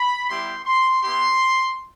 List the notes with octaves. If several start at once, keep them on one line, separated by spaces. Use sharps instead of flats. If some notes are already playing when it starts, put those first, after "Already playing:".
Already playing: B5
G3 B3 E4 G4 C6
C6
B3 E4 G4 C6